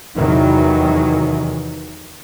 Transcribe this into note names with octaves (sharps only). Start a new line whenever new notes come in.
E2 C3 D#3 E3 F#3